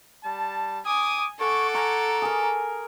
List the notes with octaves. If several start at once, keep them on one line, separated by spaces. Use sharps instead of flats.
G3 A5
G#5 D6 D#6
A4 F#5 G#5 C#6 D6
A#5 C#6
G#4 A#4